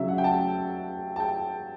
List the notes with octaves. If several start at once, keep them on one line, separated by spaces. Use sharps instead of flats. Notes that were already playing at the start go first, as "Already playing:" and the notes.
Already playing: C#3 F#3 E5
F#5
G5
A5
A5
G5